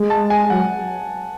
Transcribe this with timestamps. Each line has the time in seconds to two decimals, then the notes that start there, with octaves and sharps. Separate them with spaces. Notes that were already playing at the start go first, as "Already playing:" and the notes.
Already playing: G#3
0.10 A5
0.30 G#5
0.50 F#3 F#5